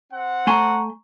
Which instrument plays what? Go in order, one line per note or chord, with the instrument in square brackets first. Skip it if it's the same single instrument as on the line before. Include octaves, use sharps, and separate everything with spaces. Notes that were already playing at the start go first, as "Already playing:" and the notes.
[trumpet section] C4 F#5
[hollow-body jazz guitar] A3 G#5 C6 [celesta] A#5 C#6